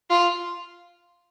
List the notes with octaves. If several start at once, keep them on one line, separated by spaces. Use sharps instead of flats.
F4